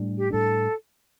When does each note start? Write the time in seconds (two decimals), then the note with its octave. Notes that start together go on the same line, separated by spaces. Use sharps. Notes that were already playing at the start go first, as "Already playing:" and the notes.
Already playing: A2 G3 D4
0.17 G4
0.30 A2 G3 D4 A4